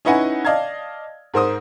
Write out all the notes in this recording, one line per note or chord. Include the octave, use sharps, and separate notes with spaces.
C#4 D#4 E4 B4 F#5 G#5
D5 D#5 F5 A5 G#6
G#2 A#4 C5 D#6